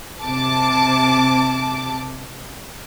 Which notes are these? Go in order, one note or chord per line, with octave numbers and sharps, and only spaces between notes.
C3 A5 D6